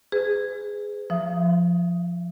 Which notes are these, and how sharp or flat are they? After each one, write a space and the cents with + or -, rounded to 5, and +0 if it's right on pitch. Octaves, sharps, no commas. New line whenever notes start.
G#4 +0 B4 +40
F3 +0 E5 +30 D#6 +5